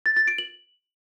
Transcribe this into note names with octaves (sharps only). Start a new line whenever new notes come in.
A6
A6
D7
F#7